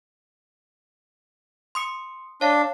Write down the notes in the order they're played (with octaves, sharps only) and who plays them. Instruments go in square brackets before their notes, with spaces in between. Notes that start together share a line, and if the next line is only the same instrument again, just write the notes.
[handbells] C6 D#6 C#7
[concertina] D4 [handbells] C#5 F5